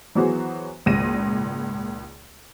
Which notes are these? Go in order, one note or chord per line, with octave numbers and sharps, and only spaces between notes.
E3 F#3 B3 F#4 G#4 C5
G#1 C#2 A#2 A#6 D#7